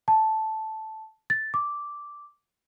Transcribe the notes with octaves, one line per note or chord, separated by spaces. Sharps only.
A5
A6
D6